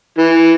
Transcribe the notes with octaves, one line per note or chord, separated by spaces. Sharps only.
E3